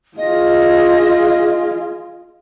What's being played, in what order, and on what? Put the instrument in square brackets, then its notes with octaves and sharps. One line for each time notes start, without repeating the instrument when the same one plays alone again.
[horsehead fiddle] F4 G#4 [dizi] D#5